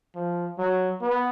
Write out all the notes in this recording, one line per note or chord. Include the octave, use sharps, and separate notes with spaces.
F3
F#3
B3